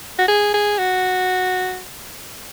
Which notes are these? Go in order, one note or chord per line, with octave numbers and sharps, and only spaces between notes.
F#4
G#4
G#4
F#4